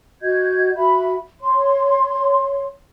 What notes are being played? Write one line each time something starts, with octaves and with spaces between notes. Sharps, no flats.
F#4 D#5 G6 G#6
F#4 E5 B5
C#5 C6